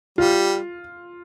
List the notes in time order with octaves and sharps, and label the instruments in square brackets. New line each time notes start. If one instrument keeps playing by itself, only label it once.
[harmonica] G3 [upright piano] F4